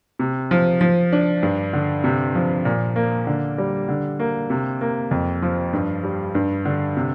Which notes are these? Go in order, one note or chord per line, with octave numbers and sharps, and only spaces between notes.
C3
F3
F3
D4
G2
D3
C3
F3
A#2
A#3
D3
G3
D3
A#3
C3
A#3
F2
F3
G2
G3
G2
D3
C3